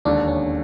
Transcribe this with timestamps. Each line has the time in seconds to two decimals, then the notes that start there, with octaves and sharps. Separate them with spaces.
0.05 E1 D#2 D3 D4
0.28 C#4